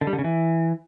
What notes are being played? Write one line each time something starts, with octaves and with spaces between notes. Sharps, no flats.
D3
G3
D3
C#3
E3